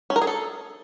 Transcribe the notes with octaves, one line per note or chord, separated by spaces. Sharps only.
C#4
A#4
G#4
A4